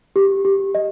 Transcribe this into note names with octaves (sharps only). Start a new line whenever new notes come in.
G4
G4
D#5